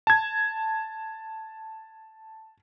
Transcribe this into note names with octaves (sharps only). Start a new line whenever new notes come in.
A5 G#6